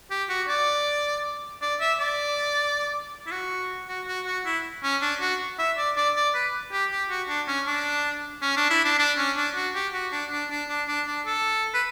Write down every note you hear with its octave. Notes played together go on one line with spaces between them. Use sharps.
G4
F#4
D5
D5
E5
D5
E4
F#4
F#4
F#4
F#4
E4
C#4
D4
F#4
E5
D5
D5
D5
B4
G4
G4
F#4
D4
C#4
D4
C#4
D4
E4
D4
D4
C#4
D4
F#4
G4
F#4
D4
D4
D4
D4
D4
D4
A4
B4